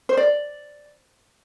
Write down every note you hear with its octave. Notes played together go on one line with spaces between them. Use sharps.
C5
D5